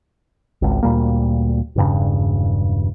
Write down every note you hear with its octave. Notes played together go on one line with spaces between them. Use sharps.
G#1 C#2
D2 A#2 G3 A#3
E1 G2 C#3